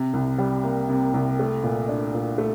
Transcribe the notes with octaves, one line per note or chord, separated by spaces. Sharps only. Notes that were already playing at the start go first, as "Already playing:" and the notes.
Already playing: C3
C2
G3
A#3
C3
C2
A3
A#2
D4
A#2
A3